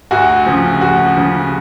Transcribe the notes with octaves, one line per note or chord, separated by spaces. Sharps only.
D2 F#4
C#3 F3
D2 F#4
C#3 F3